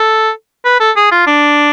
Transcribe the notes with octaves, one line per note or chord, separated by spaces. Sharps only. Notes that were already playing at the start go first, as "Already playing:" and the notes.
Already playing: A4
B4
A4
G#4
F4
D4